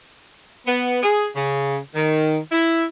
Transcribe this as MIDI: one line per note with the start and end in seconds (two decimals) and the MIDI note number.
0.67 1.01 59
1.03 1.28 68
1.36 1.77 49
1.95 2.37 51
2.52 2.84 64